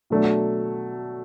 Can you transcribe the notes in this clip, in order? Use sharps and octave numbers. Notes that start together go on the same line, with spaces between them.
B2 F#3 A3 D4